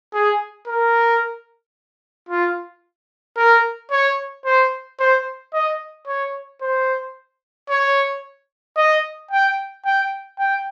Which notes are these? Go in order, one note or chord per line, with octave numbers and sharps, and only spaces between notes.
G#4
A#4
F4
A#4
C#5
C5
C5
D#5
C#5
C5
C#5
D#5
G5
G5
G5